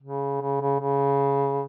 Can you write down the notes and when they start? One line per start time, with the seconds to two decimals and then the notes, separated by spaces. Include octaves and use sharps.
0.02 C#3
0.41 C#3
0.61 C#3
0.80 C#3